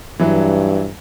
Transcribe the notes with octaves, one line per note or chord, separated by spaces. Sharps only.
G2 E3 F#3